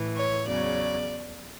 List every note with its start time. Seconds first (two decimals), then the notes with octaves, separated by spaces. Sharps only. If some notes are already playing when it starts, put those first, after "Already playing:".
Already playing: A2 E3
0.15 C#5
0.46 E2 C#3 F#3 D5